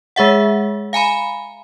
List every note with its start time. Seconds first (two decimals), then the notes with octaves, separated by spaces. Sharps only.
0.16 G#3 G#4 E5 F#5
0.93 F5 G#5 A#5 B5